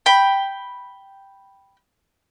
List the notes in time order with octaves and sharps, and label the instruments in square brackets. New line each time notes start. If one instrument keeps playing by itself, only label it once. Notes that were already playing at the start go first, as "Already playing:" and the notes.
[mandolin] G5 B5